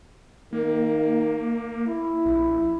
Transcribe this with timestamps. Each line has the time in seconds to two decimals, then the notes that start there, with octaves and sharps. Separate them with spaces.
0.53 D#3 A#3
1.88 E4
2.25 A#1